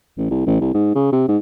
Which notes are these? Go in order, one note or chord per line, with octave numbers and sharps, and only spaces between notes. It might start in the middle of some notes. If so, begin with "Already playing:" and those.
A1
C2
A1
C2
G#2
C#3
C3
G#2